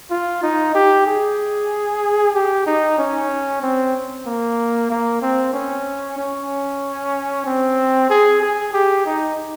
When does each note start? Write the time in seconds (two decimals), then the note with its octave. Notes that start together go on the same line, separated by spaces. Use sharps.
0.11 F4
0.43 D#4
0.75 G4
1.07 G#4
2.34 G4
2.67 D#4
2.98 C#4
3.62 C4
4.26 A#3
4.90 A#3
5.22 C4
5.54 C#4
6.18 C#4
7.46 C4
8.10 G#4
8.42 G#4
8.73 G4
9.06 D#4